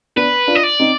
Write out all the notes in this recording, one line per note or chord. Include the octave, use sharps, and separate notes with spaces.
B3 D4 B4
D4 F4
D#5
D5
C4 D#4